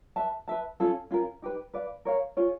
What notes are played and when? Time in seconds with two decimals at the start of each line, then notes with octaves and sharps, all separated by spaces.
0.16 B4 E5 A5
0.48 B4 E5 A5
0.80 C#4 F4 A4
1.11 C#4 F4 A#4
1.42 D#4 G4 B4
1.74 B4 D5 F5
2.05 A#4 C#5 F5
2.37 F4 G#4 C#5